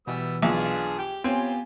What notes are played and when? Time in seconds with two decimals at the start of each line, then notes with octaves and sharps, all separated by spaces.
0.07 B2 E3 G3 B3 E6
0.42 B1 D4 F4 G#4
0.99 G4 G5
1.24 B3 C4 F4 G4 C#5 G#5